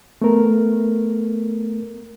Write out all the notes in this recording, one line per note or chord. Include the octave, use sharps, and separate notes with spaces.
A3 B3 A#4